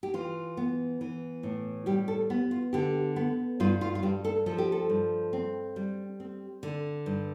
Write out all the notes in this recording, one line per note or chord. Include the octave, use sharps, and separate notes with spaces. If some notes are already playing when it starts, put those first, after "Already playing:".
G4
E3 F4
B3
E3
A2
G3 G4
A4
B3
F4
D3 G4
B3
G2 F4
F4
F4
G2 G4
A4
F3 A4
G4
A4
G2
C4
G3
C4
D3
G2